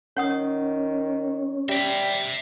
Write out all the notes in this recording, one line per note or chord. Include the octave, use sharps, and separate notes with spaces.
D#3 C#4 C#5 F#5 D#6
G3 E5 G5